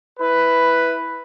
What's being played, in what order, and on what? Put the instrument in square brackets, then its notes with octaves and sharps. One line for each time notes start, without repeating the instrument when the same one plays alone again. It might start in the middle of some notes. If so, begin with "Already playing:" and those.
[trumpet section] E4 B4